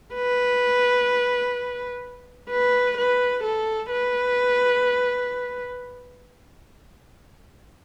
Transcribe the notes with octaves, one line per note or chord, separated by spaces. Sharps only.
B4
B4
B4
A4
B4